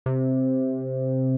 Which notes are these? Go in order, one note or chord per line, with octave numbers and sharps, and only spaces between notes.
C3